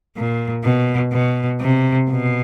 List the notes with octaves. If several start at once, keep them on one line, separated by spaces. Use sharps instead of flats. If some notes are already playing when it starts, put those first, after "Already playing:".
A#2
B2
B2
C3
B2